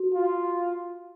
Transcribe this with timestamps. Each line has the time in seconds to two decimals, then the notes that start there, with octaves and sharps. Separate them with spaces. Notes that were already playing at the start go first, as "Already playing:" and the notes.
Already playing: F#4
0.15 F4